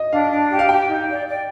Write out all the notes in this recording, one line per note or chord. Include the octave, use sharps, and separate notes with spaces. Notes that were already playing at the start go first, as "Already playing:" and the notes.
Already playing: D#5
D4 F5
D4
G4
F5
G4 G5
D#4
D5
D5